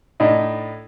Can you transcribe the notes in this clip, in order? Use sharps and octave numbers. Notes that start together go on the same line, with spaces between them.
A2 D4 D#4